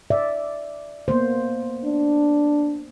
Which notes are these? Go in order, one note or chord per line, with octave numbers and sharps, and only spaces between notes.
D5 E5
A#3 B3 C5
D4